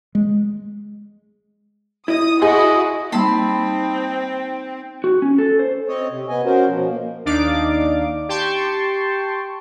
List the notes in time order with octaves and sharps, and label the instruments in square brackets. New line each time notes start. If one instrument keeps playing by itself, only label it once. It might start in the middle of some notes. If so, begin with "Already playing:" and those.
[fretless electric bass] G#3
[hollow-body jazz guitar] E4 D#5 [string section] D#6
[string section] E4 F#4 [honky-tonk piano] G#4 [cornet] D#5 [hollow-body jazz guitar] C6
[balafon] G3 A#3 [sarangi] C4 [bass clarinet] D#4 [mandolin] A5 B5 C6
[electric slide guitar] F#4
C#4
A4
C5
[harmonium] C4 C#5 D#5
C3
B3 D#5 G#5
C#4 F#4 A#4 C5
B2 F3
A#3
[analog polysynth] D#2 D4 D#4 D5 F5 D6
G4 G5 A5 C6 C#6